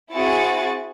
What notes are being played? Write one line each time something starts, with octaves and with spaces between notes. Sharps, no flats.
C4 E4 F#4 G#4 C#6 A6